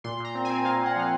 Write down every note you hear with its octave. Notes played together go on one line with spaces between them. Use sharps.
A#2 C6
A#2 A#5
C4
G#5
C4
A#2 F5
A#2 F#5
F3 F5